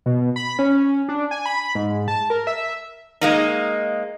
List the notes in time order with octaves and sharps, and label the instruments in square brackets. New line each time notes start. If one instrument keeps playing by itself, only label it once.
[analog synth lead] B2
B5
C#4
D4
G#5
B5
G#2
A5
A#4
E5
[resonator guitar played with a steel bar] G#3 A#3 D#4